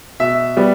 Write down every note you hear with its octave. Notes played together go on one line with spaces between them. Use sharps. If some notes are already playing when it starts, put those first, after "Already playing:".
B2 E5
G3 B3